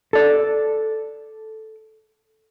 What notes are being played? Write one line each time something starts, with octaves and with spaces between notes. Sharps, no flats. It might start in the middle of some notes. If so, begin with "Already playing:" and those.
A4 D5